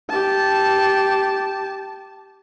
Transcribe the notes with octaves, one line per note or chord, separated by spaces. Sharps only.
G4 A5